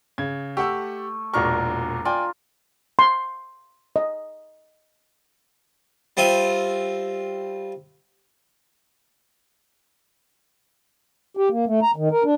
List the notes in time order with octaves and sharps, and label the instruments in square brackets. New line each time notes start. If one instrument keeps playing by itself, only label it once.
[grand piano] C#3 G#6
[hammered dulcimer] A3 [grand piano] G4 F#5 E6
[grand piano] E1 A#2 C#6 [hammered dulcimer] D4 A#4
[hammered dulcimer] F4 [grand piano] D5 G5 G#5
[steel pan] C6
D#5
[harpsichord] G3 C4 F4 D#5 E5
[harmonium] G4
A#3
A3
A#5
D#3
A#4
D4